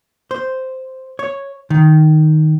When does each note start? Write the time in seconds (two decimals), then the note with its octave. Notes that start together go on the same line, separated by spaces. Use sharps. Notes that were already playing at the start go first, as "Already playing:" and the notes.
0.31 C5
1.19 C#5
1.70 D#3